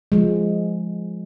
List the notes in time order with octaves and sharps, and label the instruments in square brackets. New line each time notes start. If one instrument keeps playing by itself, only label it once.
[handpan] F3 G#3